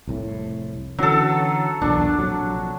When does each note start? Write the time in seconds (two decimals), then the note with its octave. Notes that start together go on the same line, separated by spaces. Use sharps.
0.07 F1 C2 A2
0.99 D3 E3 F#3 C#4 A4
1.82 B1 E2 A#2 D4
2.19 A#1 C3 F#3